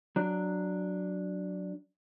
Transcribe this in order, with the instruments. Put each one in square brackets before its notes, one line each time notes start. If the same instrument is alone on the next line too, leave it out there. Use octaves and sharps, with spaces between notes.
[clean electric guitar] F#3 D4